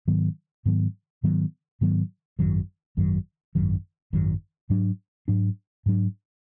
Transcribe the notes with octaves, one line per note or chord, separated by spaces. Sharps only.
G#2 D#3 F#3 B3
G#2 D#3 F#3 B3
G#2 D#3 F#3 B3
G#2 D#3 F#3 B3
G#1 F#2 D#3 F#3
G#1 F#2 D#3 F#3
G#1 F#2 D#3 F#3
G#1 F#2 D#3 F#3
G#2 F#3 D4
G#2 F#3 D4
G#2 F#3 D4